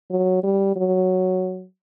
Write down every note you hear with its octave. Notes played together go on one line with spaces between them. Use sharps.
F#3
G3
F#3